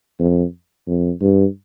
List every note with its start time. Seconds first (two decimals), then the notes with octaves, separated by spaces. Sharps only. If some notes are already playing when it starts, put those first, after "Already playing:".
0.19 F2
0.87 F2
1.21 G2